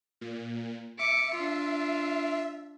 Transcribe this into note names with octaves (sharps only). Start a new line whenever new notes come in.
A#2
E5 D6 C#7
D4 F4